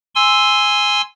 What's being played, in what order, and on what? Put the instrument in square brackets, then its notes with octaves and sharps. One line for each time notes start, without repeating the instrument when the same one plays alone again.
[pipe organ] G#5 C6 E6